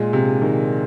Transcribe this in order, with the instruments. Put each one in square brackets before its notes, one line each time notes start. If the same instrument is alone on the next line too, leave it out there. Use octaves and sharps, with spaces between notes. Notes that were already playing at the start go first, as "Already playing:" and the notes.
Already playing: [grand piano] A#2 G#3
C3
D#3